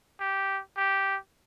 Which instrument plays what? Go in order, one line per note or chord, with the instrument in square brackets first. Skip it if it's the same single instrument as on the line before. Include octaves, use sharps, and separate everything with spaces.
[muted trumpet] G4
G4